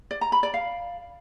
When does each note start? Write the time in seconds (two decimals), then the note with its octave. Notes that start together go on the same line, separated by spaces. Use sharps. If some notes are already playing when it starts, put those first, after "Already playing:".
0.11 D5
0.21 A#5
0.32 B5
0.43 D5
0.54 F5